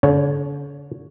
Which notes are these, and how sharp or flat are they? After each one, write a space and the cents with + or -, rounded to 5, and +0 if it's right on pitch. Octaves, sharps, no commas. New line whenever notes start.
D3 -45 C#5 +0